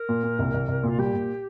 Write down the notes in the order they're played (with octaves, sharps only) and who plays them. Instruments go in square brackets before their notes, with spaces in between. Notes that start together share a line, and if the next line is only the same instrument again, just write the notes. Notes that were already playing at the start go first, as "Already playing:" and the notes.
Already playing: [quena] A#4
[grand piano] A#2
A#2
C2
C2
C2
[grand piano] A#2 [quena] F4
[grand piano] G3 [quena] G4
[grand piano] A#2